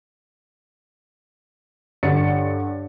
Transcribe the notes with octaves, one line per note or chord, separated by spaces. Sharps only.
G2 D3 C#5 A6 C#7